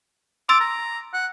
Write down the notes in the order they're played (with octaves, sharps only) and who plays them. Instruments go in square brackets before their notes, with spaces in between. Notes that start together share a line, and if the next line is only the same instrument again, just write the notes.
[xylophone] C6 E6 A6 [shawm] D6
[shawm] A#5
F#5